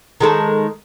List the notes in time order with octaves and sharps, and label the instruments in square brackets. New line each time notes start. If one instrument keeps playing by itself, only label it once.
[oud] D#3 G#3 A4